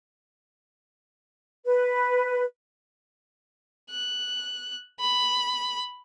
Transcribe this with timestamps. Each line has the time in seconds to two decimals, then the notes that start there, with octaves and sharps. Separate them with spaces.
1.66 B4
3.91 F#6
5.00 B5